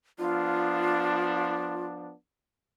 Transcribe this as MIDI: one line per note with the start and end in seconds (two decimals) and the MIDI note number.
0.19 2.13 53
0.19 2.13 59
0.19 2.13 62
0.19 1.85 65